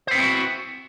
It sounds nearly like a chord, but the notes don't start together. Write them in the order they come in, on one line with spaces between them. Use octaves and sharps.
C5 B3 C4 E4 F#4